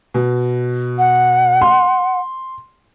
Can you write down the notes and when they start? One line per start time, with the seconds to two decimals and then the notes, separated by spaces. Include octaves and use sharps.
0.14 B2
0.98 F#5
1.62 C6